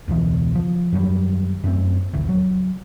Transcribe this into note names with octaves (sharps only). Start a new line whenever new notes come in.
E1 C#2 B2 E3
F3
F#2 D#3 F#3 G3
F#2 A3 C4
D#1 A1 D2
F#3